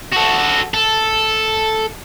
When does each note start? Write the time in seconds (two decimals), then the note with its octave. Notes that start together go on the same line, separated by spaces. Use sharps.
0.13 F#4 A4
0.74 A4